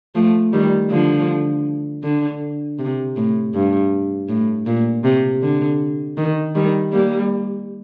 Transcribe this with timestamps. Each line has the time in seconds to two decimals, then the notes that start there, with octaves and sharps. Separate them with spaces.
0.15 F3 A3
0.53 D#3 G3
0.90 D3 F3
2.03 D3
2.79 C3
3.17 A2
3.54 G2
4.29 A2
4.66 A#2
5.04 C3
5.42 D3
6.17 D#3
6.55 D#3 G3
6.92 G3 A#3